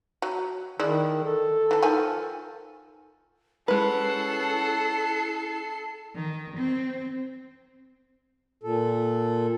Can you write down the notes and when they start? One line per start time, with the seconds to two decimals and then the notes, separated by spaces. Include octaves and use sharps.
0.22 F#3
0.79 D#3 G#3 E4 D5
1.24 A4
1.71 E3 A5
1.82 D#3 F3 G#5
3.68 G#3 C#4 E4 A4 B4 F#5 C7
6.15 D#3
6.57 C4
8.63 A#2 A4